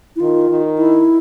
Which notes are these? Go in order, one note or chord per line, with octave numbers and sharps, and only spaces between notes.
E4
D#3 F4
D#3
E4